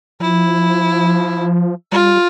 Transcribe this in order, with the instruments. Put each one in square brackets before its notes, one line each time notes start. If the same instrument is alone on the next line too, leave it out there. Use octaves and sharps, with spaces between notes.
[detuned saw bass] F3 [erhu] E4
[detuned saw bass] G3 [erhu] F4